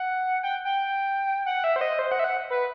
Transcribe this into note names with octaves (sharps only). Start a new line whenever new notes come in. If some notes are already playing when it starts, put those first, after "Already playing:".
Already playing: F#5
G5
G5
F#5
E5
C5
D#5
C5
F#5
E5
F#5
B4